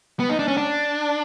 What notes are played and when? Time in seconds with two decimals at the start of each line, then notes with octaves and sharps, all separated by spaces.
0.20 B3
0.29 D#4
0.39 D4
0.48 C#4
0.57 D4